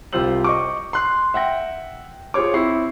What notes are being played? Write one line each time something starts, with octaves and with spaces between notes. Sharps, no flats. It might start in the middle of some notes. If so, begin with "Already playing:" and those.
C2 F4 G4 C5 E6 F#7
D#5 C#6 D6
C6 F#6 C7
E5 F#5 G5 A#6
F4 G#4 C5 C#5 D6
C4 E4 C#6 C7